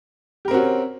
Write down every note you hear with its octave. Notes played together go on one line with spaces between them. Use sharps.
C4 C#4 F#4 G4 A#4